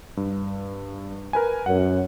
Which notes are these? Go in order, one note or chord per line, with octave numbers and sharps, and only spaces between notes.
G2
A#4 B4 G#5
F#2 F#5